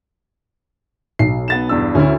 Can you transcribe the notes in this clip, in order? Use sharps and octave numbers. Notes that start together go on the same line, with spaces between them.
B1 C7
B3 A6 E7
E2 G2 E6
D2 C#4 E4